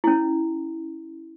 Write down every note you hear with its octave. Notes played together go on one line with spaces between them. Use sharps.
C#4 E4